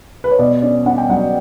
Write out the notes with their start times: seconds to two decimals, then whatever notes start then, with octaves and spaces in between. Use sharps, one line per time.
0.24 B4
0.31 C#5
0.39 B2 D5
0.62 C#4 D5
0.86 C#4 F#5
0.98 G5
1.09 F#3 F#5